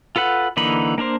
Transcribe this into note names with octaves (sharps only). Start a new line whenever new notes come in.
F4 A4 B4 F#5
D3 E3 A#3 D#4 B5
A#3 D4 A#4 C5